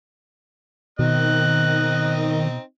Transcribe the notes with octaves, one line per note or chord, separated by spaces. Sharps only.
B2 D#3 C4 D#4 D#5 F#6